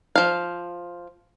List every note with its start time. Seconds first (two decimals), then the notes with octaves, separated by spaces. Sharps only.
0.15 F3 F5